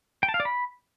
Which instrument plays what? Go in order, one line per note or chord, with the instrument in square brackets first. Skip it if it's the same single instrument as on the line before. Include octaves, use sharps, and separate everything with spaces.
[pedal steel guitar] G5
A5
F5
D5
B5